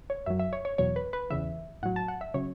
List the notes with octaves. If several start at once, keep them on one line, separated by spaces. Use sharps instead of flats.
C#5
F#2 F#3 E5
E5
C#5
C#5
E2 B2 F#3 C#5
B4
B4
E2 C#3 E3 E5
A2 F#3 F#5
A5
F#5
E5
C#3 F#3 C#5